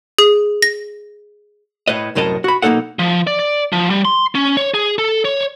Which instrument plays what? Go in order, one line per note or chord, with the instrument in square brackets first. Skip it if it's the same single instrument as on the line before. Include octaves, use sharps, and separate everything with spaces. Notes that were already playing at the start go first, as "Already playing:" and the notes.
[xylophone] G#4
A#6
[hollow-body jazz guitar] A2 B4 D#5
C2 F#2 A2 A#4 D#5 A5
F#4 B5
B1 A#3 C#4 D#4 A4 F#5
[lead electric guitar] F3
D5
D5
F3
G3
C6
C#4
C#5
G#4
A4
C#5